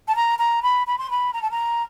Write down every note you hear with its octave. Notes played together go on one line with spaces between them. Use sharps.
A5
A#5
A#5
B5
B5
C6
B5
A#5
A5
A#5